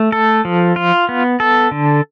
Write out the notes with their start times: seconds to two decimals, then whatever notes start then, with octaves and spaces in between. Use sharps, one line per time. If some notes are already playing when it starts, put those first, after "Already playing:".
Already playing: A3
0.12 A4
0.45 F3
0.76 F4
1.09 B3
1.40 A4
1.71 D3